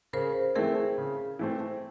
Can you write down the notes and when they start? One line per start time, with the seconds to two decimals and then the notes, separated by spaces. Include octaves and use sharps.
0.13 C#3 A#4 C5
0.55 E3 A3 C4 G#4 A#4
0.98 C#3
1.39 E3 A3 C4